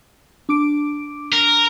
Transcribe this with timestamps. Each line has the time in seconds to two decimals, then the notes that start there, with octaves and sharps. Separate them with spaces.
0.49 D4 D6 D7
1.33 A#4